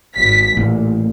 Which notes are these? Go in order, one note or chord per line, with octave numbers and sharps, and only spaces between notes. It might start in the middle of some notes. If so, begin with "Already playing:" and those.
G#1 B6
A1 A#2